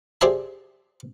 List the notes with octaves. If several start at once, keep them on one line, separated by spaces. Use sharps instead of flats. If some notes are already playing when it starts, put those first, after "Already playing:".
G4 G#4 C5 D5 E5 A5